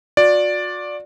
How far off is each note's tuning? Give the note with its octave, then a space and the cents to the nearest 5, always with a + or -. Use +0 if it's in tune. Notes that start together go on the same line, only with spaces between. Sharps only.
F#4 -40 D5 +0